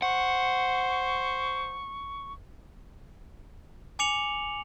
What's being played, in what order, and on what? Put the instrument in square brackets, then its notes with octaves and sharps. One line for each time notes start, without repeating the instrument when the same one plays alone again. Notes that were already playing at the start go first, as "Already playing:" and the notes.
[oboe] C5 [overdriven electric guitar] F#5 [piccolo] C#6
[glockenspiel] G#5 D6 C#7 F7 F#7